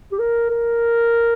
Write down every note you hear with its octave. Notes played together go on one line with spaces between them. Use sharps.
G4
A#4
A#4